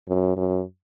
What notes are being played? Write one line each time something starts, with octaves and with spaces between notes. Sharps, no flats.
F#2
F#2